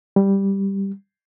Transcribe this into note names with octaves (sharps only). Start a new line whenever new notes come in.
G3